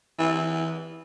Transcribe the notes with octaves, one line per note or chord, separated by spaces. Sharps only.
E3